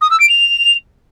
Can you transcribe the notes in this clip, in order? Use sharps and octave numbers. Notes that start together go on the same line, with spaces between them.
D#6
E6
D7
F7